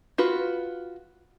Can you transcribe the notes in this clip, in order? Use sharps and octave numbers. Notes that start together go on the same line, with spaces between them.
F4 F#4 B4